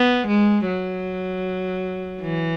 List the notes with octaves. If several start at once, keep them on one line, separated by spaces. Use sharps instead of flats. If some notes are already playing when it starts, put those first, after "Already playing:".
Already playing: B3
G#3
F#3
E3